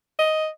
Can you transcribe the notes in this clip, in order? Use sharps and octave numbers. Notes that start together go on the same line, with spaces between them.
D#5